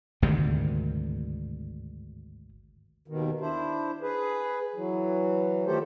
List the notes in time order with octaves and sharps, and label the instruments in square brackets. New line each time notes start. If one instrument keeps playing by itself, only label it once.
[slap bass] G#1 D2 G2 C3
[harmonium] D#2 B2 D#3
D4 E4 C5
G#4 B4
E3 F#3
D#3 F3 A3 G4 A4 C5